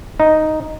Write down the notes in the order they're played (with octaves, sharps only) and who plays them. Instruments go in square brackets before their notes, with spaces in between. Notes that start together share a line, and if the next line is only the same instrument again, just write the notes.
[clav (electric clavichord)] D#4